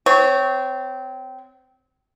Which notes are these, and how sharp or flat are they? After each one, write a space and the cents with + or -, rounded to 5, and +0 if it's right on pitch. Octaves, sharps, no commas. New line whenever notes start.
C4 -20 C#5 +0